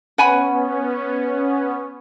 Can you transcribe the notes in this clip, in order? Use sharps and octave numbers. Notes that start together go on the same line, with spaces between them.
B3 C#4 F#5 G#5 B5